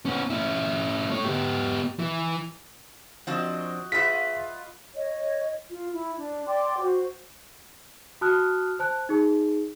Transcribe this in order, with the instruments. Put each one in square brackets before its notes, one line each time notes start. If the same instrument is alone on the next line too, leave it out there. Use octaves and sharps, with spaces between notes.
[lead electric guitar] B3 C#4
C#4 E4
A3 C#5
B3 G4
E3
[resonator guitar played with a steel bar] F3 C4 D4 [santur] F#4 D#5
[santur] F4 B4 F#5 [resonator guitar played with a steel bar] G#4 E5 [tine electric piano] B6
[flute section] C#5 D#5
F4
E4
D4
D5 G5 C6 D6
F#4 C5
[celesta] F#4 A5 D#6 F6 F#6
C5 A5 F#6
D#4 G#4